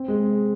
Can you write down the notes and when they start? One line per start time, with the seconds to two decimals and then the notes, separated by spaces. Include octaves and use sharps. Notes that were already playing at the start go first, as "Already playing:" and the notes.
Already playing: C4
0.08 G#3